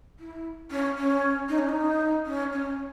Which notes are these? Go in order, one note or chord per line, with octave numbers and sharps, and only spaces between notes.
E4
C#4
C#4
D#4
C#4
D#4
C#4
C#4